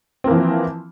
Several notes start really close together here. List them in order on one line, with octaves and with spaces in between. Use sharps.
C4 A#3 E3 F3